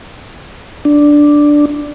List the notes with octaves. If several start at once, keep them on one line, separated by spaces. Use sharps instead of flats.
D4